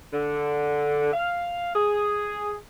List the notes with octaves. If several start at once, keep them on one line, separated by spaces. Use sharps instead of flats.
D3
F5
G#4